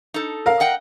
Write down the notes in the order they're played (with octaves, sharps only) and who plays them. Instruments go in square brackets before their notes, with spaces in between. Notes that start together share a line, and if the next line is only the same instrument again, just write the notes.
[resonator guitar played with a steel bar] D#4 A4
[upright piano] A#4 F5
[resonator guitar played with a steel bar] D#5 F#5 G5